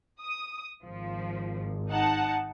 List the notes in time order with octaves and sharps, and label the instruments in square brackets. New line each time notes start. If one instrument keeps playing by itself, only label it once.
[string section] D#6
[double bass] G#1 [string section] F3
[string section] D#4 F#5 A5